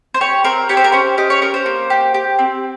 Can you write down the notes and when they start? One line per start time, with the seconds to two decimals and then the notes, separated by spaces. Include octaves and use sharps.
0.14 C5
0.21 G4 C#5
0.44 C4 A#4
0.69 G4 C#5
0.77 C5
0.84 A#4
0.92 C#4 C5
1.18 G4 D#5
1.30 C#5
1.42 C#4 A#4
1.54 C5
1.66 A#3
1.90 G4
2.14 G4
2.39 C4